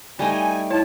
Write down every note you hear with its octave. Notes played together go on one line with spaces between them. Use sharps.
G3 A3 D#4 G#5
E4 C#5 A5